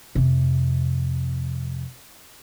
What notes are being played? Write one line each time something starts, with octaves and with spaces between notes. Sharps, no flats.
F2 C3